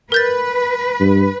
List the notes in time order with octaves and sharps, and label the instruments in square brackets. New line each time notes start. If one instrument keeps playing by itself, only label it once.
[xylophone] A#4 G6 A6 [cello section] B4
[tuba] G2